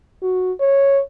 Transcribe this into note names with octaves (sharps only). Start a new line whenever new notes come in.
F#4
C#5